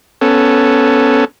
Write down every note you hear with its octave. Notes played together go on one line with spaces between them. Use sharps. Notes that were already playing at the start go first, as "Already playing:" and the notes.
B3 C#4 A4